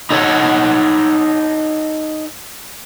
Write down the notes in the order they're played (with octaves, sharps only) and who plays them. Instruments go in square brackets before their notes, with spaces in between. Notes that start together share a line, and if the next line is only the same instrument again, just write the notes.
[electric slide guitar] D#4 A4 C#5 F#5